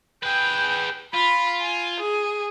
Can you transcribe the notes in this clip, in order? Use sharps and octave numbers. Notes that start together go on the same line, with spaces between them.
G#4 B4 G5
F4 B5
G#5
G#4